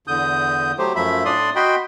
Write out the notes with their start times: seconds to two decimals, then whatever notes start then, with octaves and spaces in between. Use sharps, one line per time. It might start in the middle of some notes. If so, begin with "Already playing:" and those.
0.07 E2 D3 D#6 G6
0.78 F#3 A3 G4 C5
0.96 F#2 F3 A3 E5 B5
1.25 A2 D4 D5 C6 D#6
1.56 F#4 D#5 G5 B5 C6